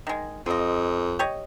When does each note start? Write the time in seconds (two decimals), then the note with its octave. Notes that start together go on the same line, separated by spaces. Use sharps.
0.07 D#3 G#3
0.46 F2 F4 D#5
1.19 G4 C#5 D#5